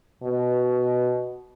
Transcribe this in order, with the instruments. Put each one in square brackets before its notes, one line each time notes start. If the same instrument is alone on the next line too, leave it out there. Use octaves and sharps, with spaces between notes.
[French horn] B2